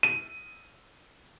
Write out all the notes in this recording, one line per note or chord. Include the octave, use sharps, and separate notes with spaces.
D#7